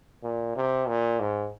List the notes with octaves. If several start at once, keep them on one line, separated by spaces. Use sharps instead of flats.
A#2
C3
A#2
G#2